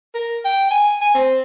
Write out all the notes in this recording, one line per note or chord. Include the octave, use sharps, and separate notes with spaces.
A#4
G5
G#5
G#5
C4